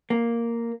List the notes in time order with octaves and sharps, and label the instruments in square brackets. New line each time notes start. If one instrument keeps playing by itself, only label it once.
[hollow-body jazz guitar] A#3